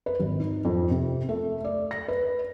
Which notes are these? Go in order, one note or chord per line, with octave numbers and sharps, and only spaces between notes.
B4
G#1
D#4
F2
C3
A3
D5
A#6
B4